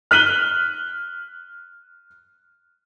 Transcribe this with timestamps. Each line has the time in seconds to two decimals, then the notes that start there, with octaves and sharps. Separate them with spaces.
0.11 F6 F#6 B6 D#7 F#7 G7